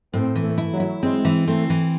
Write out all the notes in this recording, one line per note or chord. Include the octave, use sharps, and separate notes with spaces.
A2 C4
E3
A3
E4
F#3
E4
G#3 C4
E3
A3 C4
E3